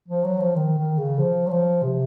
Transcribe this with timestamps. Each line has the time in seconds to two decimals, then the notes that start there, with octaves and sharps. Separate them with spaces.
0.08 F3
0.24 F#3
0.40 F3
0.56 D#3
0.77 D#3
0.98 C#3
1.19 F3
1.47 F#3
1.51 F3
1.82 C3